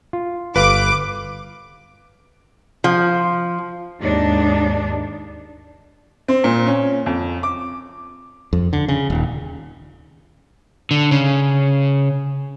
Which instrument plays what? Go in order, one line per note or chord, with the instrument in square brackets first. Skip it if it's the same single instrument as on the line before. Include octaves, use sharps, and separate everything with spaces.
[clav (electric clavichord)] F4
[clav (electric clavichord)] G1 [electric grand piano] B4 F5 [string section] D6
[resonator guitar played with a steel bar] F3
[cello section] D#2 G#2 D4 D#4
[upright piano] C4
A#2
C#4
F2
D6
[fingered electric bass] F2
D3
C#3
D#1
[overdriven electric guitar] D3
C#3